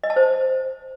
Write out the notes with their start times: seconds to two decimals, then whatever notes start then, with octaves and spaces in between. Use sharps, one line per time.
0.03 D#5
0.10 A5
0.16 C5